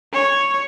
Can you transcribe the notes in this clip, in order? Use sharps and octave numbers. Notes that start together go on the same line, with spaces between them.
C#5